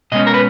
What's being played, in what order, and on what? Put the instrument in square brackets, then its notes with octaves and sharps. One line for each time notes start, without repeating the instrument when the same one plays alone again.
[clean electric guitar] B2 G#3 C#4 D#5
A#4
B4